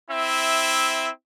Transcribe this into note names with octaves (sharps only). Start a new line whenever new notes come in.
C4 E4 E5